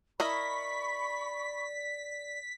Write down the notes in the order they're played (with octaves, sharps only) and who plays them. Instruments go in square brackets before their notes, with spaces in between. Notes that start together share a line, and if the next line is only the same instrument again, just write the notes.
[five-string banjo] E4 A#4 D#5 [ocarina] D5 [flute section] B5 C#6 [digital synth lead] B6